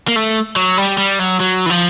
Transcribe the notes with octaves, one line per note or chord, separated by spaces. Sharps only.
A#3
A3
F#3
G3
G3
F#3
F#3
E3
F3